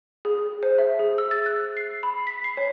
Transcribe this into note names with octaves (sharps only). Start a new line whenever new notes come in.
G#4
C5
E5
G#4
E6
A6
F#6
C7
B5
B6
C7
C#5